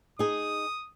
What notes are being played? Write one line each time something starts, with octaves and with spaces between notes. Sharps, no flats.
D#4 G#4 D#6